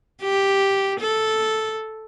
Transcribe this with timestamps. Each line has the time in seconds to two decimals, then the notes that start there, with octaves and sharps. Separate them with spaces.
0.23 G4
1.00 A4